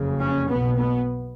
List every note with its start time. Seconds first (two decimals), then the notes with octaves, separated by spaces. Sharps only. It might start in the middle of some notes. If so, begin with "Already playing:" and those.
Already playing: F#1 F2 C#3
0.19 C#4
0.48 B1 B2 B3
0.77 B3